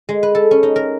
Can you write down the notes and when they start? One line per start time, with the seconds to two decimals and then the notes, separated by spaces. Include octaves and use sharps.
0.09 G#3
0.23 B4
0.35 A4
0.51 C#4
0.63 D#4
0.76 A#4